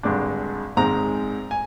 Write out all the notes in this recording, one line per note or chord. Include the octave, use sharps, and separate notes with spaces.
G#1 G2 D3 G#3 D4
A#1 G#2 D#3 G#3 C4 A#5
G#5